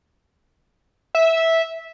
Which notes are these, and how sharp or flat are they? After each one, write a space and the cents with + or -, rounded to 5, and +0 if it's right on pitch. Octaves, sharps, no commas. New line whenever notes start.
E5 -10